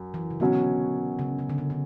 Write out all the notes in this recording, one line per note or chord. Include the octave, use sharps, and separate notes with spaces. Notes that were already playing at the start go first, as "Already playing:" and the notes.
Already playing: F#2
E3
C#3
B2 D3 F#3 C#4
C#3
C#3
D3
C#3
D3